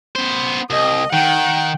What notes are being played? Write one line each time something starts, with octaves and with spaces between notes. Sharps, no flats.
B3 C5
C2 D#5
D#3 F#5 G5